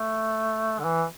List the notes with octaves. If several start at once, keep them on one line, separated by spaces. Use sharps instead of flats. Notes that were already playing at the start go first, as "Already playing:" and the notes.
Already playing: A3
D3
E3